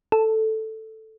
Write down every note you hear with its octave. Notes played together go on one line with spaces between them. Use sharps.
A4